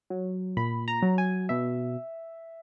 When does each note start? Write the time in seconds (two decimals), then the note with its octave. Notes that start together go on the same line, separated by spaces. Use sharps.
0.10 F#3
0.57 A#2 B5
0.88 A#5
1.02 F#3
1.18 G#5
1.49 B2 E5